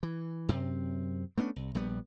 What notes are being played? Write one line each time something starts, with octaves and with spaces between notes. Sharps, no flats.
E3
F#2 C3 C4
A3 B3 C#4 D4
C2
A#1 G3 B3